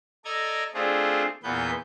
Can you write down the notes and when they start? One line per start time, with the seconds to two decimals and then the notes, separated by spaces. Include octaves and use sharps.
0.25 A4 D5 D#5 A#5 G#6
0.74 A3 C4 D4 F4 G#4
1.43 E2 A#2 B3 B4 G6